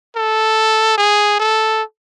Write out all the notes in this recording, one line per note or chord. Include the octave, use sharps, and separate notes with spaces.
A4
G#4
A4